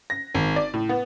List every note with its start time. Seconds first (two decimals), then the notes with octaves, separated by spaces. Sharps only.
0.10 A#6
0.34 G#1
0.56 D5
0.74 A2
0.89 B3